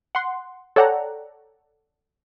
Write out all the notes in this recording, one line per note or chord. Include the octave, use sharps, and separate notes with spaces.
F#5 C6
A4 C#5 D5 F#5 G5 A#5